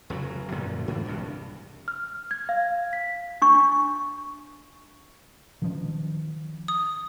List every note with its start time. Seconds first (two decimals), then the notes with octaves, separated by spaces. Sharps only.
0.10 F1 C#3 F#3
0.52 F#2 A#2 D3 F3
0.88 G#2 E3 D4
1.06 C2 G2 C3
1.88 F6
2.31 G#6
2.49 F5
2.93 B6
3.42 D4 C#6
5.62 D#3 F3 C#4
6.68 D#6